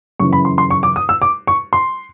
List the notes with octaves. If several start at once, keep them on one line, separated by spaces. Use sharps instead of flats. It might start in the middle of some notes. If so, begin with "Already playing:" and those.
F#2 C#3 E3 C#6
B5
C6
C6
C#6
D6
D#6
E6
D6
C#6
C6